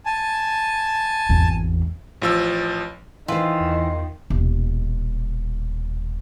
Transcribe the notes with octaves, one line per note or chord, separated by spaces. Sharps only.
G#5 A5
G#1 E2
A1 F3 E6
D#3 E3 F4 C5
E2
D#1 B2